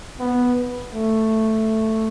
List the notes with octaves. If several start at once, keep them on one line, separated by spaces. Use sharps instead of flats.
B3
A3